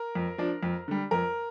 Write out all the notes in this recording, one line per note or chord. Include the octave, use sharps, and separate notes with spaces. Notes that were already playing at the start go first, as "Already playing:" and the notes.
Already playing: A#4
F2
F3 D4
F2
D3 G3
F2 A#4